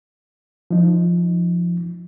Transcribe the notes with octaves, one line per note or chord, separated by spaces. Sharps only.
F3 D#4